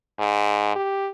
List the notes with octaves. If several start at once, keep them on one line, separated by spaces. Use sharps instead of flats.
G#2
G4